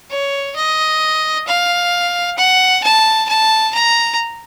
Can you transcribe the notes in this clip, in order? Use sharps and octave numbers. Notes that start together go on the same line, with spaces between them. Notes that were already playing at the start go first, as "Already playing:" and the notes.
C#5
D#5
F5
F#5
A5
A5
A#5